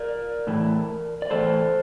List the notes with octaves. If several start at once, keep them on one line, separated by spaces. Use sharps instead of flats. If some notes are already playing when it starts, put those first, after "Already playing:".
Already playing: A#4 D5
A2 E3 A3
D5
A2 E3 A3 A4 C5